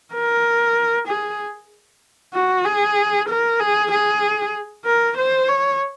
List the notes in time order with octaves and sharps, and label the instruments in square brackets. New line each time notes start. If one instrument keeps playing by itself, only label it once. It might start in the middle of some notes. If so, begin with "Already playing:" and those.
[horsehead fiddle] A#4
G#4
F#4
G#4
A#4
G#4
G#4
A#4
C5
C#5